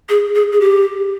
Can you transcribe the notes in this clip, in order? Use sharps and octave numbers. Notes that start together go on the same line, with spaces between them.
G#4
G#4
G#4
G4